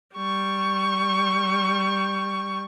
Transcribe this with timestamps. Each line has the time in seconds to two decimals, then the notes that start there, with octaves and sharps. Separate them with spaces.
0.16 G3 C#6